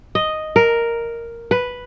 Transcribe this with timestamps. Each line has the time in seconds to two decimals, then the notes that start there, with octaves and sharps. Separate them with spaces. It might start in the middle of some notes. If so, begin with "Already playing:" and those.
0.15 D#5
0.56 A#4
1.51 B4